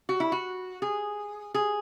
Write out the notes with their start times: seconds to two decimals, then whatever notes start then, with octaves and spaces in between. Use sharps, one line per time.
0.09 F#4
0.20 E4
0.32 F#4
0.82 G#4
1.54 G#4